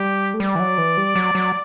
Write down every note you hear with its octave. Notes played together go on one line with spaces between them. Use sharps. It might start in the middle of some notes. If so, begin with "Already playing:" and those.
Already playing: G3 G4
A3
G3 D5
E3
F#3
E3
G3
F#3
F#3